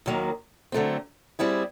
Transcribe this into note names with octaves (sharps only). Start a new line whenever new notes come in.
D#2 D#3 F#3 A#3
D3 F#3 A3 C4
G3 C4 E4 G#4